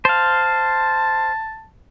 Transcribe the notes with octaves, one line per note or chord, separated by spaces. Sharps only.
C5 F5 A5